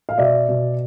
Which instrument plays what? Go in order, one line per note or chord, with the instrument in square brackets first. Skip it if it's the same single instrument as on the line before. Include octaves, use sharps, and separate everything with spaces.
[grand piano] F5
B2 D5 E5
B2